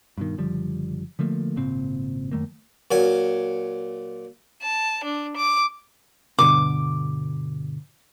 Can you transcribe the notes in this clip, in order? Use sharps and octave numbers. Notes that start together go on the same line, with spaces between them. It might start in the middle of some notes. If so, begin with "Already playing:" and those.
G2 B2 D#3
F#1 D3 F3 G3
D3 F3 A3 A#3
G#1 A#2 C#3 C4
F#2 D#3 A3 A#3
A#2 F#3 G#5
A5
D4
D6
G2 B2 D3 D6